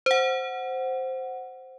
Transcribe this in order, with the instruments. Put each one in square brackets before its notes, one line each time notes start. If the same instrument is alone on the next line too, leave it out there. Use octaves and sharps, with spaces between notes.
[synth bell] C5 F#5